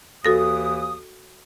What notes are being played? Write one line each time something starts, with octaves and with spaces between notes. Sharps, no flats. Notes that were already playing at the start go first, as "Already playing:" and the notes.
D#2 E3 F#4 A4 D#6 A#6